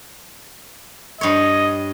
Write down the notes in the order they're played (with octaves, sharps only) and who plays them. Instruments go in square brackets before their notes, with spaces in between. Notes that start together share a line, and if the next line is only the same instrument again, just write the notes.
[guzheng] G2 C#5 [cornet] D#5